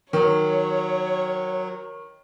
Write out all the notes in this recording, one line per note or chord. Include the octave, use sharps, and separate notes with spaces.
D#3 F#3 C#5